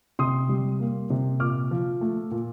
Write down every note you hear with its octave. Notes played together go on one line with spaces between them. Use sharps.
C3 C6 D#6
G3
A#3
C3
A#2 D6 F6
F3
A3
A#2